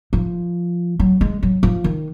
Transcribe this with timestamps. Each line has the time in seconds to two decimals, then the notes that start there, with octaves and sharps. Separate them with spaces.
0.13 F3
1.00 F#3
1.21 G#3
1.43 F#3
1.63 F3
1.84 D#3